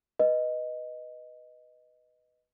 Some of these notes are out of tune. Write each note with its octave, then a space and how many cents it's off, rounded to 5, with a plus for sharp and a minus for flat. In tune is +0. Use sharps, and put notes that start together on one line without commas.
B4 +0 D#5 +0